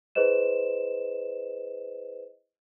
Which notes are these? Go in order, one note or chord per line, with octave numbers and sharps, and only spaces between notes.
E4 G#4 B4 C5 D#5 E7